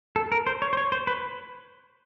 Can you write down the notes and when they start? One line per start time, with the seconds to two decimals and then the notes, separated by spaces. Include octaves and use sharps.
0.16 A4
0.32 A#4
0.47 C5
0.62 C#5
0.73 C5
0.77 C#5
0.92 C5
1.07 B4